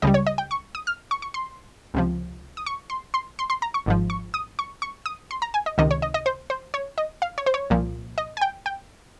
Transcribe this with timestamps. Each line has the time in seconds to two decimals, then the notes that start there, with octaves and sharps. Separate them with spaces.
0.02 C#2 C#3 G3 D#5
0.14 C#5
0.27 D#5
0.38 G5
0.51 C#6
0.75 D#6
0.87 F6
1.11 C#6
1.22 C#6
1.34 C6
1.94 C#2 C3 F3
2.57 D#6
2.66 C#6
2.90 C6
3.14 C6
3.39 C6
3.50 C6
3.62 A#5
3.74 C#6
3.86 G#1 G#2 F3
4.10 C#6
4.34 D#6
4.59 C#6
4.82 C#6
5.06 D#6
5.31 C6
5.42 A#5
5.54 G#5
5.66 D#5
5.78 C#2 C3 D#3 D#5
5.91 C#5
6.02 D#5
6.14 D#5
6.26 C5
6.50 C5
6.74 C#5
6.98 D#5
7.22 F5
7.38 C#5
7.46 C5
7.54 C#5
7.70 C2 A#2 F3
8.18 D#5
8.37 G#5
8.41 G5
8.66 G5